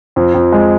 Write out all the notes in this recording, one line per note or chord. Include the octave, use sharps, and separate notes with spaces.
F2
F2
G#3